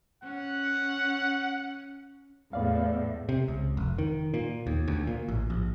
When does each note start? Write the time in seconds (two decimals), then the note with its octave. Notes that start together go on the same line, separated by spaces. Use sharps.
0.23 C#4 F#5
2.53 E2 A2 B3 D5 F5
3.29 C3
3.48 C#2
3.77 F1
3.98 D#3
4.34 A#2
4.67 D#2
4.88 D2
5.07 A#2
5.28 A1
5.50 A#1